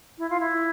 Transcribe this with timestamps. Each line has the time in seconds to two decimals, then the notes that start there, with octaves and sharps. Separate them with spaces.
0.18 E4
0.30 F4
0.40 E4